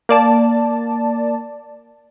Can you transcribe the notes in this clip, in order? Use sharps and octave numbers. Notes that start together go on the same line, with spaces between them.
A#3 D5 A5